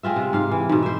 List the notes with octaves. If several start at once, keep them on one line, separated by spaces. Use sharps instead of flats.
G#3 C4 F4 E5
C3
G#2 F5
E3
G#2 B2
C5 E5